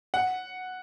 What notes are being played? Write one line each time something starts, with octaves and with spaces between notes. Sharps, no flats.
F#5